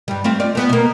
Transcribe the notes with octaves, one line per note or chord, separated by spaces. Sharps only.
G2 G3
A3 C4 F4
F4 D5
A3 B3
B2 A#3